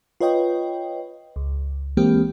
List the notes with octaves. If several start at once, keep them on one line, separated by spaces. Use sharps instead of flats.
F4 B4 C#5 D#5 G5
C#2
E3 G#3 A#3 C4 G4